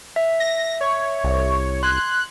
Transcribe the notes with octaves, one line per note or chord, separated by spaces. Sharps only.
E5
A#6
C#5
C2
C6 F#6 G#6